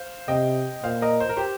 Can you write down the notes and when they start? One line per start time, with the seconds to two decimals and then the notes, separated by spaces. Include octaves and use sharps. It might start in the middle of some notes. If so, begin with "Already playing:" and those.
Already playing: C5 F5
0.28 C3 D#5 G5
0.83 A#2 C5 F5
1.02 A#4 D#5
1.20 C5
1.29 A#4
1.37 G4 C5